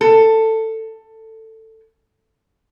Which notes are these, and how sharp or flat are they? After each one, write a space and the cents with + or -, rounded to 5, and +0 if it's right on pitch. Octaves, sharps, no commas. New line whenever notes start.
A4 +15